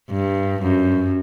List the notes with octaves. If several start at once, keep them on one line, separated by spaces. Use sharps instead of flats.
G2
F#2